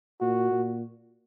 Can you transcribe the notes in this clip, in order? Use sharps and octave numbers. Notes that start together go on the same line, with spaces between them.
A#2 F#4
A#2